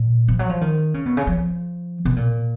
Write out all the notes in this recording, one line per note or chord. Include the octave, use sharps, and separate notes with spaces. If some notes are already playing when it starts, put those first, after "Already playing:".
Already playing: A#2
F3
F#3
F3
D#3
C#3
B2
C#3
F3
B2
A#2